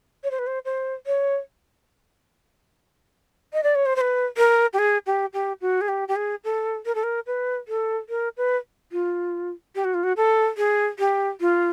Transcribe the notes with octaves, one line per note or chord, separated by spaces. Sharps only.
C#5
C5
B4
C5
C5
C#5
D#5
D5
C#5
C5
C5
B4
A#4
G4
G#4
G4
G4
F#4
G#4
G4
G4
G#4
A4
A#4
A4
A#4
B4
A4
A#4
B4
F4
G4
F#4
F4
F#4
A4
G#4
G4
F4